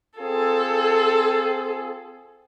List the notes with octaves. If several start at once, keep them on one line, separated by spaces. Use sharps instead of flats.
C4 F4 G#4 A4